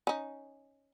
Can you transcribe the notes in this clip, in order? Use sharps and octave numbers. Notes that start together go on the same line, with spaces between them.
C#4 D#4